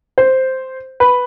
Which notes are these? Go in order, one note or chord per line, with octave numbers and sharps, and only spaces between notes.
C5
B4